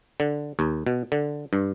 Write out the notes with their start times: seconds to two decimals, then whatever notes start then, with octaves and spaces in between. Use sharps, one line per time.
0.20 D3
0.59 D#2
0.87 B2
1.12 D3
1.53 G2